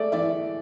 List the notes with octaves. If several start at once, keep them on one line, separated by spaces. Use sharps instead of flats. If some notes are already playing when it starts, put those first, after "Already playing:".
Already playing: G#3 A3 D5 E5
E3 D5 E5